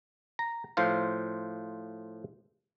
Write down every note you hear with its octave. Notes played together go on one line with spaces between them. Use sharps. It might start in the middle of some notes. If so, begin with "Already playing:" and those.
A#5
A2 F3 C5 F5